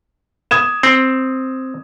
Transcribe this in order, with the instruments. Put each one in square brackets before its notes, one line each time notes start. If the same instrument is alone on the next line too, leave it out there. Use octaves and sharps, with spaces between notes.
[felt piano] D#6 G#6 E7
[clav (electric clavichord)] C4